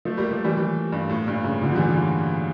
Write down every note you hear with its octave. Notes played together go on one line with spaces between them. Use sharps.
F3 A3
G3 A#3
F3 A3
E3 G3
E3 G3
G2
A2
G2 A#2
A2 C#3
A#2 D3
F3
E3 G3
D3 F3